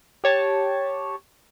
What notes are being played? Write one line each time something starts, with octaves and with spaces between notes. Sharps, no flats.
G4 C#5 A5